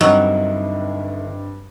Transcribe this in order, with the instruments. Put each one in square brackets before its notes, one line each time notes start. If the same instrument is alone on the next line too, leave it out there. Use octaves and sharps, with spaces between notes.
[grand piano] G2 C4 E6 [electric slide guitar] D3 D#4 E4 [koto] F#3 [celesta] D#5